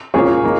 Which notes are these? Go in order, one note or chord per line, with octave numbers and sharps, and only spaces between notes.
A#2 A#3 C#4 G#4 C#5
A#3 D#4